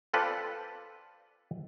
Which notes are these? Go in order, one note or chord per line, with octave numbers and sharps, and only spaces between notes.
C4 F4 A4 B4 D5